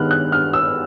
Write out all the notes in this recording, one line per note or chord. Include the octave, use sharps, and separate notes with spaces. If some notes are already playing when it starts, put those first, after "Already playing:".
Already playing: G2 D#3 G#3 B3 F6 F#6
F#6
G2 F6
E6